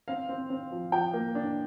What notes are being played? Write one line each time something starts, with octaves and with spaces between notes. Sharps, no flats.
C4 F5
C4
C4
F3
F3 G5
A#3
D4